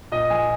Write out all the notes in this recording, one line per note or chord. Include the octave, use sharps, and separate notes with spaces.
A#2 D#5
F3 G#5